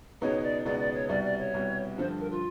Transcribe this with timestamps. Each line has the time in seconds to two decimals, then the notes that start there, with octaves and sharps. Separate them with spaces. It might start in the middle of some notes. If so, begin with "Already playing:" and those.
0.21 C#2 B2 G#3 B3 D#4 C#5
0.43 D5
0.65 C#2 B2 G#3 B3 D#4 D5
0.79 D5
0.95 C#5
1.09 C2 B2 G3 D5
1.24 D5
1.39 C#5
1.54 C2 B2 G3
1.98 G2 D3 F3 C5
2.20 A#4
2.31 F4